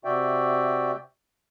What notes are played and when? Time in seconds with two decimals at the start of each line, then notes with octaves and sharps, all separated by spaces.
0.05 C3 F#4 D5 E5 G5